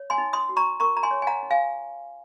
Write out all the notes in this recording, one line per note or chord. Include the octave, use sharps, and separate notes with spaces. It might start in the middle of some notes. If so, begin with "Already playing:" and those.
Already playing: C#5
G#5 C6
D#4
C6 D#6
F#4
A#5 C#6
A#4 A#5 C#6
A#5
G#5 C6
C#5
G#5
F#5 A#5
D#4
F5 G#5